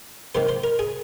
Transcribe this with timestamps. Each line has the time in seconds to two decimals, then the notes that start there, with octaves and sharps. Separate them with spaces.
0.35 C3 D#3 A#3 C5
0.49 C5
0.64 A#4
0.79 G#4